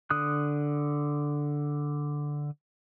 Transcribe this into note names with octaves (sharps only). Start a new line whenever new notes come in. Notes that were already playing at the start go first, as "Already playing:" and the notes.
D3 D#6 F#6